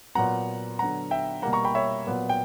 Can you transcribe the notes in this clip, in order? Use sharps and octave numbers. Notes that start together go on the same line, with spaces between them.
A#2 F#3 B3 F#5 A#5
D3 F#3 B3 F#5 A#5
E5 G5
B2 G3 A#3 F#5 A#5
A#5 C#6
G5 B5
C#5 E5
A#2 F#3 B3
G5